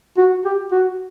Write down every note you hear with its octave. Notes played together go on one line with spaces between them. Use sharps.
F#4
G4
F#4